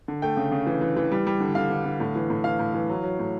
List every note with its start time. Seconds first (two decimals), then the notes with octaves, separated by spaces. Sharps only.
0.08 D3
0.22 A3 G5
0.37 C#3
0.52 C#3
0.66 E3
0.81 E3
0.97 E3
1.12 G3
1.27 G3
1.40 D3
1.55 D3 F5
1.70 D3
1.85 D3
2.00 A2
2.16 E3
2.30 A2
2.44 E3 F5
2.59 A2
2.74 E3
2.89 F#3
3.03 F#3
3.19 A2